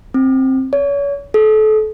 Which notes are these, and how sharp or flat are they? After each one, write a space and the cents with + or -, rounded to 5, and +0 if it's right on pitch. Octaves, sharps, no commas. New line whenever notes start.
C4 +15
C#5 +35
A4 -30